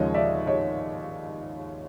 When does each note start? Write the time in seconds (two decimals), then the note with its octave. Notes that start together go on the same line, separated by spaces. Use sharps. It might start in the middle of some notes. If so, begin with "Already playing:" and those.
Already playing: D#2 C#3 F3 G#3 C#5 D#5
0.14 D5 E5
0.47 C#5 D#5